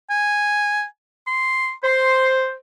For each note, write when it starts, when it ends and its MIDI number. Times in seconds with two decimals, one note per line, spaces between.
0.10 0.84 80
1.27 1.72 84
1.84 2.54 72
1.84 2.37 84